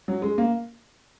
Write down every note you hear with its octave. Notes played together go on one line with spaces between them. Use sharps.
F#3
G#3
A#3